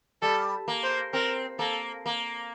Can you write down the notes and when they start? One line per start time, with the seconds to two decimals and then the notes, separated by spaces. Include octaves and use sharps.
0.22 G3 A4
0.68 A#3
0.83 C5
1.13 C4 A#4
1.59 A#3 A4
2.06 A#3